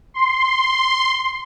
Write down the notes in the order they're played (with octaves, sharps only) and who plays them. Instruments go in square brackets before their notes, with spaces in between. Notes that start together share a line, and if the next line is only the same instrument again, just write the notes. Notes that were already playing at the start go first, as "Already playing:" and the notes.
[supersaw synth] C6